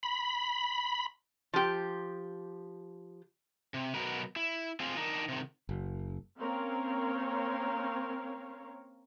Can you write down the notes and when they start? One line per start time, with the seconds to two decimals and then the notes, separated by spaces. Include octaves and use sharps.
0.03 B5
1.54 F3 G4
3.74 C3
3.94 B2 F#3 A#4 B4
4.36 E4
4.80 C4 F4 G#4
4.97 D4 D#4 A#4
5.28 C3 D#3
5.69 F#1
6.39 A#3 C4 C#4 A#4 C#5 F5